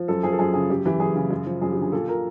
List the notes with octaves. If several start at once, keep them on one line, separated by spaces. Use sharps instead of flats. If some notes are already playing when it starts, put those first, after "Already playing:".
Already playing: F3
F#2 A4
F3 G#4
A4
F#2 G#4
C#3 G#4
F#2 G4
E3 G4
F#2 G#4
C#3 G#4
F#2
F3
F#2 G#4
D3 G4
G#4
A#2 A4
A#2 A#4